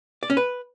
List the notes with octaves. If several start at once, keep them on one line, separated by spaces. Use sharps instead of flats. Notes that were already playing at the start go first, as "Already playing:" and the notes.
D5
C#4
B4